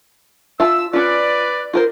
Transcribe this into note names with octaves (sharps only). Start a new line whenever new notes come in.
F4 E5 A5 E6
C#4 F4 B4 D5
F4 A#4 C5